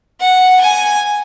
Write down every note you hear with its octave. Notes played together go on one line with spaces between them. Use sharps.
F#5
G#5